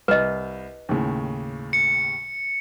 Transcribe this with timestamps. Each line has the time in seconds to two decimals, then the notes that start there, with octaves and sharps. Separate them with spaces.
0.08 C2 B4 D#5
0.89 D#2 A2 C#3
1.73 C#7